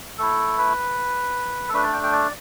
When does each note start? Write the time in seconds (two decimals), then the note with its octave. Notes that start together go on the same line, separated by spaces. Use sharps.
0.18 A3 E4 A4
0.58 B4
1.69 A4
1.73 A3 D4 B4
1.83 D5
1.93 G5
2.03 G5
2.12 D5